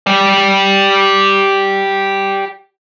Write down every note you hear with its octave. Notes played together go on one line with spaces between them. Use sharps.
G4 D5